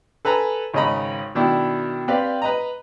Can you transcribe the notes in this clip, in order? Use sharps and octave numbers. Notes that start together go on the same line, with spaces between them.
A4 B4 G#5 A#5
G#1 C#3 C#4 D#5 A#5 B5
B2 D#3 D4 E4
C4 G4 B4 D5 F5 G5
B4 D#5 A#5